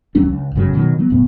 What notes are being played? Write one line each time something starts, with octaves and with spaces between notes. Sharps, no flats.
D#2 F#3 C#4 D4
C#2
G1 F#2 C#3 F#3
B2 D#3 E3 F#3
F3 F#3 B3
E1 C#2 A2 B3